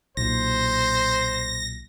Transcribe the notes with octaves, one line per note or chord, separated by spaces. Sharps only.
B1 A#2 C5 A#6